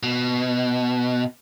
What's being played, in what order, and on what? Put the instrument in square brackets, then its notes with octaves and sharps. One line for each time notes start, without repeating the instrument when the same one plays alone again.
[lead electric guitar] B2